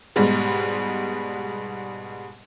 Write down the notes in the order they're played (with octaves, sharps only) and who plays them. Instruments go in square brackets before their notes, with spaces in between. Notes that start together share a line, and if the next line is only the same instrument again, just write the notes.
[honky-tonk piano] G#2 B2 G3 G#3